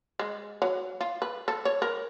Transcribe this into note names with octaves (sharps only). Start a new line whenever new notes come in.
G#3
F#3
F4
B4
A4
C#5
A#4